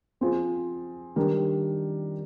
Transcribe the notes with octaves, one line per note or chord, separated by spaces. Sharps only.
F3 C4 F4 G#4
D#3 G3 D4 G4 A#4